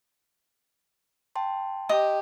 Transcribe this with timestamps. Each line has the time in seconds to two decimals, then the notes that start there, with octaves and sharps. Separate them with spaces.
1.35 G5 A5 C6
1.89 G4 D#5 D#6